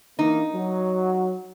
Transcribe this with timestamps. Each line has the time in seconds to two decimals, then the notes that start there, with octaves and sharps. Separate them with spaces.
0.19 E3 A#3 D#4
0.55 F#3